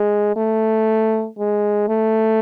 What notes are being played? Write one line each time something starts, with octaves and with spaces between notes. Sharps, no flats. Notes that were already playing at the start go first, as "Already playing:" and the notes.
Already playing: G#3
A3
G#3
A3